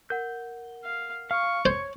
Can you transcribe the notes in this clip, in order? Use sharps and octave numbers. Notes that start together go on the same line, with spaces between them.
A#4 F#5 G6
F5
F5 C#6 F6
C5 C#5 G#6